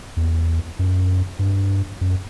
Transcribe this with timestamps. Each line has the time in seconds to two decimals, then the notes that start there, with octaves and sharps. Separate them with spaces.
0.17 E2
0.79 F#2
1.39 G2
2.01 F#2